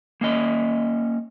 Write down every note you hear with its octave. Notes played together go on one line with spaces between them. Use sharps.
A#3 C#4 D#5